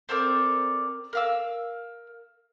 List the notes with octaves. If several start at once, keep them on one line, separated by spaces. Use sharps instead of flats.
C4 A4 A#4 D5
A#4 F5 E6